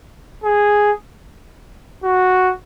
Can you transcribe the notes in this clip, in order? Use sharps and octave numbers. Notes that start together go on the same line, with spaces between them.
G#4
F#4